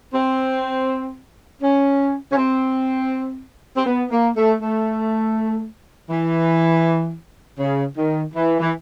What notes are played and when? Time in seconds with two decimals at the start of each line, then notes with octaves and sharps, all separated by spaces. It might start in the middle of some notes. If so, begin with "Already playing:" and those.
0.13 C4
1.62 C#4
2.31 C#4
2.37 C4
3.76 C4
3.86 B3
4.11 A#3
4.36 A3
4.60 A3
6.10 E3
7.59 C#3
7.97 D#3
8.34 E3
8.60 E3